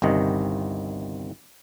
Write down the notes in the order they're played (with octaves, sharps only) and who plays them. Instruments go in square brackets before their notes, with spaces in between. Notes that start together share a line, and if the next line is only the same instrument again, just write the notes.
[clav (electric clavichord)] G1 C2 C3 D#3 D#5